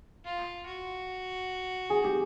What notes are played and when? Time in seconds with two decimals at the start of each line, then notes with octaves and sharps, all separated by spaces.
0.25 F4
0.66 F#4
1.90 G#4
2.04 G4